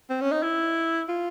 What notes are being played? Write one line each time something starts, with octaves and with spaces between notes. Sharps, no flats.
C4
C#4
D#4
E4
F4